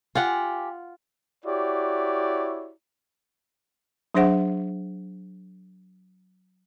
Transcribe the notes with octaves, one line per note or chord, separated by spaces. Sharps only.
F4 G4 F#5 G#5
E4 F#4 G4 C#5 D5
F#3 D4 G#4 C5 E5 F#5